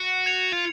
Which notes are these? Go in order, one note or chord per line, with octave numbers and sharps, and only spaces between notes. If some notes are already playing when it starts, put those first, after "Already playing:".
Already playing: F#4
G#6 C#7 F7
F4